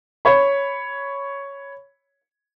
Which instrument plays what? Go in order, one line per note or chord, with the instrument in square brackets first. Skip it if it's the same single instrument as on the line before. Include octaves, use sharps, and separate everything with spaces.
[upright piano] C#5 B5